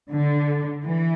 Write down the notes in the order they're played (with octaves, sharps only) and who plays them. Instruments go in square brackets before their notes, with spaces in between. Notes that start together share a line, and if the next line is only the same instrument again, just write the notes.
[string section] D3
E3